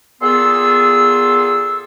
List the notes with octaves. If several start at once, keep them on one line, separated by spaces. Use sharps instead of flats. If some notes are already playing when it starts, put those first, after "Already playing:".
A#2 B3 G#4 A4 C6 E6